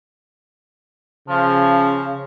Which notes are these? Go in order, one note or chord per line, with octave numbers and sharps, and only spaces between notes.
C#3 F3